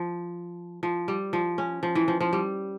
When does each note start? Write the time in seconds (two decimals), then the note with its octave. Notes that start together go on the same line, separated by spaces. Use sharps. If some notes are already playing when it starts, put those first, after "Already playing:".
Already playing: F3
0.83 F3
1.08 G3
1.33 F3
1.58 C#4
1.83 F3
1.95 E3
2.08 F3
2.20 F3
2.33 G3